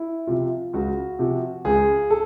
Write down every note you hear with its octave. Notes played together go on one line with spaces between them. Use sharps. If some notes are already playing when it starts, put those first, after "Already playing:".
Already playing: E4
C3 F3 F4
C#2 F#4
C3 F3
C#2 G#4
A4